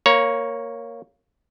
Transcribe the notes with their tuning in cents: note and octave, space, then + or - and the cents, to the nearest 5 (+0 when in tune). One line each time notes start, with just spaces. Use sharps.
A#3 +0 C#5 +0 A#5 +30